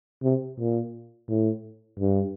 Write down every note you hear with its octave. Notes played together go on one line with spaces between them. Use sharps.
C3
A#2
A2
G2